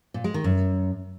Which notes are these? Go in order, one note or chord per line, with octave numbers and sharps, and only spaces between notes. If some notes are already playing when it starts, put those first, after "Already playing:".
A#2
G#3
D#3
F#2